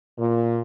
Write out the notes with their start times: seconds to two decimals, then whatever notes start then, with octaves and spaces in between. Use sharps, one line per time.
0.19 A#2